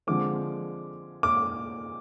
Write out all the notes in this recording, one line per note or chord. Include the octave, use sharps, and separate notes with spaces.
D3 F3 G#3 C4 D6
D6